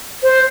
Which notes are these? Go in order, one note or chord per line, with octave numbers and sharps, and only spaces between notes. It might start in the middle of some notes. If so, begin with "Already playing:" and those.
C5